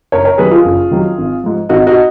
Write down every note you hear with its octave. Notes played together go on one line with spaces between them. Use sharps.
F#1 A#4 C#5
A#4 C#5
F2 D#3 F#3 G#4 B4
F4 G#4
F#1
F2 D#3 F#3
G#1
G#2 F3
G#1 D#4 F#4
D#4 F#4